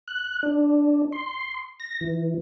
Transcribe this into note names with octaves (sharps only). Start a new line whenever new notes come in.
F#6
D4
C6
A#6
E3